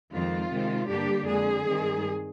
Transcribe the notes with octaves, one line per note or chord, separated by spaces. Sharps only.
F2 D#3 G#3 C4 F4
C3 D#3 G#3 C4
G2 D3 G3 A#3 D4 G4
F2 D3 G#3 G#4
G2 D#3 G#3 C4